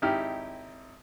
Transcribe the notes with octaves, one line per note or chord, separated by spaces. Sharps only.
G#1 D#4 E4 G4 F6